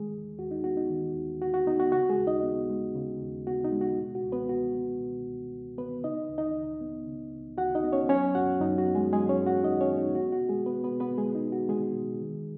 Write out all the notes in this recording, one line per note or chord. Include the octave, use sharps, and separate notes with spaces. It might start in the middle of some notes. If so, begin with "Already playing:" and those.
Already playing: D#3 G#3 G#4
D#2
D#2 F#4
D#4
B3 F#4
D#4
D#3
D#2
D#2 F#4
F#4
B3 D#4
F#4
C#3 F#4
G#3 G#4
D#2
D#4 D#5
B3
G#3
C#3
D#2
B3 F#4
D#4
G#3
F#4
B2
F#4
C#2
B3 B4
C#2 F#4
B3
B2
C#2
C#2
B3 B4
C#3 D#4 D#5
C#2
D#4 D#5
C#2
B3
C#3
C#2
C#2 F#4 F#5
D#4 D#5
B3
C#4 C#5
F#3 C#4 C#5
F#2 F#4 F#5
F#2 D#4
F#4
B3
G#3 G#4
F#3 G#3 G#4
C#4 C#5
F#2
F#4 F#5
F#2 D#4 D#5
C#4 C#5
B3
D#4
B3 F#4
F#4
B2
G#3 G#4
B3 B4
B3 B4
B2
B3 B4
G#3 B3 G#4
D#4
B2
F#4
G#3 B3 G#4
B2
D#3